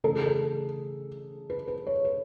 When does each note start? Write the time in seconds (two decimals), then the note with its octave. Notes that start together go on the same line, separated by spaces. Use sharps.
0.04 C#3 E3 A3 A4
0.15 G#4
0.26 A4
1.50 B4
1.68 B4
1.87 C#5
2.05 B4